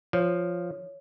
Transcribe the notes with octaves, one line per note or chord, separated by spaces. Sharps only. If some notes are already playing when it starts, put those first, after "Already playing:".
F3 C#5